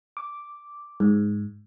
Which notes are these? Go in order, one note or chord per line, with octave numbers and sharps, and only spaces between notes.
D6
G#2